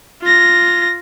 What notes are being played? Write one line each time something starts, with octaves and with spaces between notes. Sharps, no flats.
F4 A#6